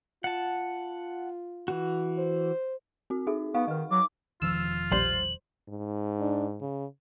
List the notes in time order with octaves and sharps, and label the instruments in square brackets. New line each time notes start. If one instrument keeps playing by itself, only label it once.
[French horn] F4 [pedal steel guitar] F#5 A5
[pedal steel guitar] E3 F#4
[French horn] C5
[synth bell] C4 F#4
[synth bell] D#4 [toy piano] G#4 A4 E5
[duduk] B3 [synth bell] D#4 F#5 C#6 [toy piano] F5
[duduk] D#3 [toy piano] B4 D#5
[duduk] F#3 [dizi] D6
[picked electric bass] E1 D#3 F3 [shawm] F4 [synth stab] E6
[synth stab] A#1 G3 C5 [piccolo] F#7
[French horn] G#2
[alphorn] D4
C#3